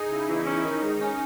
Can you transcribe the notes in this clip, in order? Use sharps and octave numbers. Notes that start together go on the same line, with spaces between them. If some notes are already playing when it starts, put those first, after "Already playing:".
Already playing: D#4 G#4
C#3 E4
E2
C#4
D#3 D#4
G#2
C#4